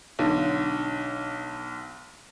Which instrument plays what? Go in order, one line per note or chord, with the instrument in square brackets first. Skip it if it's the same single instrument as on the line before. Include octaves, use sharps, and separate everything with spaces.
[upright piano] B1 D3